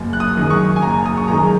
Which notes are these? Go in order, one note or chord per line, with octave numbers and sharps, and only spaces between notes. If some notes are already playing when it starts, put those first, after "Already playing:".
Already playing: F#1
F#6
D#6
F#2 D#3 G#3
C#6
G#5
F#1 A#5
D#6
C#6
F#2 D#3 G#3 A#5